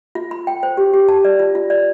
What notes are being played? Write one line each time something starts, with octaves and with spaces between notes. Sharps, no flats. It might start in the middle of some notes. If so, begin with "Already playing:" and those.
F4
B5
G5
C5
G4
G4
A5
D5
F4
F4
D5